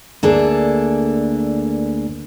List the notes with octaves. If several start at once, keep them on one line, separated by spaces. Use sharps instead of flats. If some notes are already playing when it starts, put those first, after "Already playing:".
D2 A#3 D4 G#4 A4